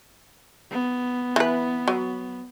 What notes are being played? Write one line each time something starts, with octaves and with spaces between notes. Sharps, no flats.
B3
E3 B4
F#3